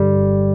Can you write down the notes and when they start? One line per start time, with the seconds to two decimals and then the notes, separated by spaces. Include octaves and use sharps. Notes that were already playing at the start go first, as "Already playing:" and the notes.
Already playing: G2 D3 G3
0.16 G1